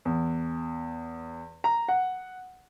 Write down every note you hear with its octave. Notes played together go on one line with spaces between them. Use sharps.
E2
A#5
F#5